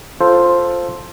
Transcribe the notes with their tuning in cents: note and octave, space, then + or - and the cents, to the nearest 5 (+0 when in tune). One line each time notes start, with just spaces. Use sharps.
F4 +0 A4 +0 C5 +5